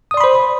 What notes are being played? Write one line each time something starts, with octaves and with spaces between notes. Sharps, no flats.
C5 D5 B5 C6 D#6